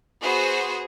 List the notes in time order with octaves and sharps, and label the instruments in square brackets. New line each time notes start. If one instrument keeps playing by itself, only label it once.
[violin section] B3 F#4 G#4 C5